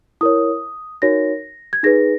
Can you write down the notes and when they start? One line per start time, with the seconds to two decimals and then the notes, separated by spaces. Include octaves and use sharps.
0.21 E4 A#4 C#5 D#6
1.02 D#4 F#4 A#4 C#5 A#6
1.73 G#6
1.83 D#4 G#4 B4 A#6